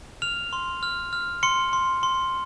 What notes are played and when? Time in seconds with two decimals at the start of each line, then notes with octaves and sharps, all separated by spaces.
0.22 F6 F7
0.53 C6
0.83 F6
1.13 F6
1.43 C6 C#7
1.73 C6
2.03 C6